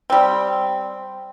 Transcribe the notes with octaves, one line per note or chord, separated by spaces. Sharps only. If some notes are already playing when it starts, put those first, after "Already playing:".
G3 C4